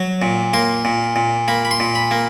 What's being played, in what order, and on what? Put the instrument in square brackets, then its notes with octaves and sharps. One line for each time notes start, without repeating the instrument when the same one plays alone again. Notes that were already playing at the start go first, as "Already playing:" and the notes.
Already playing: [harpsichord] F#3
A#2
A#3 C6
A#2
A#2
A#3 B5
B5
C6
A#2
B5
A#3